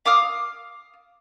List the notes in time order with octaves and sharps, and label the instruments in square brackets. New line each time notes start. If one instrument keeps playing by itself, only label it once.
[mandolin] F5 D6 D#6 F6